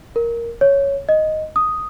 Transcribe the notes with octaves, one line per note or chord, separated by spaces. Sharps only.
A#4
C#5
D#5
D#6